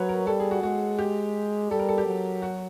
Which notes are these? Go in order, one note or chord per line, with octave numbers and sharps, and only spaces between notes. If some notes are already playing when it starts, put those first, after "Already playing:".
Already playing: F#3 B4 C#5
A#4
G3 A4
G#4
F#4
G#3 F#4
G4
G3 A4
A#4
A4
G4
F#3
F#4